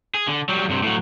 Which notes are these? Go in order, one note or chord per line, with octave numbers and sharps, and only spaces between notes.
G#4
D3
F#3 G3
G2 C3
A2 F#3